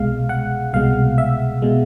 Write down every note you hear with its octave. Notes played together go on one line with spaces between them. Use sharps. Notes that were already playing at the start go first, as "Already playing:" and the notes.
Already playing: C2 B2 G#3 F5
F#5
C2 B2 G#3 F5
E5
B2 G#3